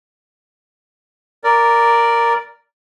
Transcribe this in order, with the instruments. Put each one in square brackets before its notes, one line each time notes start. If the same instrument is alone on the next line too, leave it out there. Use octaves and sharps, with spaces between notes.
[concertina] A#4 D5